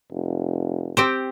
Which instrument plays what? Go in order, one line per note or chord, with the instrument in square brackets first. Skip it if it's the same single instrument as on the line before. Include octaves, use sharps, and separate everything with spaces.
[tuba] F1
[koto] C4 G4 C5